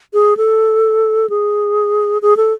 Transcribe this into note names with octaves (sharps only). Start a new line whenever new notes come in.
G#4
A4
G#4
G#4
A4